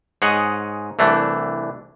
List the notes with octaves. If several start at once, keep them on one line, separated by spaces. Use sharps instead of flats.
G#2 G#4 C#5 D#5 F#5
C2 E3 A3 D4